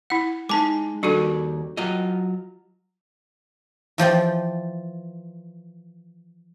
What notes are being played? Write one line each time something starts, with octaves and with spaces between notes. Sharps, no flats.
E4 F#5
G#3 D#4 A5 D6
D#2 G3 D4 F#4 A4
F#3 F4 D#5
E3 F3 D5 G5